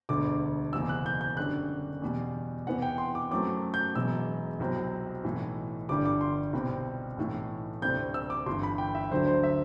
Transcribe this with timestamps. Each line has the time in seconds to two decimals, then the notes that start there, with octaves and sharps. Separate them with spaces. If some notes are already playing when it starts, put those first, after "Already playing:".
0.09 E1 D2 D3 D6
0.73 F#1 E2 B2 E6
0.89 F#6
1.06 G6
1.21 G6
1.37 F#2 D3 G3 D4 F#6
2.02 E2 B2 G3
2.67 E2 C3 E3 B3 F#5
2.82 G5
2.98 C6
3.15 D6
3.31 F#2 F#3 A3 C4 D6
3.74 G6
3.95 E1 E2 B2 F#3 E6
4.60 C2 B2 F#3 C4
5.24 B1 A2 E3
5.89 G1 G2 D3 G3 D6
6.05 D6
6.21 C6
6.53 C2 B2 G3 C4
7.17 B1 A2 E3 A3
7.82 D2 C3 G3 C4 G6
8.14 E6
8.30 D6
8.46 G1 G2 E3 C6
8.63 B5
8.78 G5
8.95 E5
9.11 D2 D3 F#3 C5
9.27 C5
9.43 E5